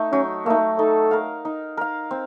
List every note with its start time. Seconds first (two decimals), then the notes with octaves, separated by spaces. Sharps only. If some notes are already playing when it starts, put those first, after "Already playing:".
Already playing: A3 D#4
0.12 F#3 C#4
0.45 A3 A#3 D#4
0.79 D#4 A4
1.11 A#4 F5
1.45 D#4
1.77 A#4 F5
2.11 C4